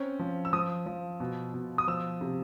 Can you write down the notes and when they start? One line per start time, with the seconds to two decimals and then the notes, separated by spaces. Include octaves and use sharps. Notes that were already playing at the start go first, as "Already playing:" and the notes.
Already playing: C4 C#4
0.19 F3
0.45 E6
0.53 F3 D#6
0.86 F3
1.20 B2
1.54 B2
1.78 D#6
1.88 F3 E6
2.21 C3